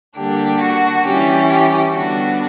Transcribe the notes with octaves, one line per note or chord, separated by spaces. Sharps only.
D3 G3 A#3 D4 G4
F#4
E3 G3 C#4 G4
G4
D3 G3 B3 D4 F#4